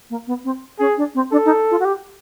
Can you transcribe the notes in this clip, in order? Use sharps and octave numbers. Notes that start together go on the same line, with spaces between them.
A#3
B3
C4
C#4 G#4
D4
C4
D4 A4
D#4
F4
F#4
G4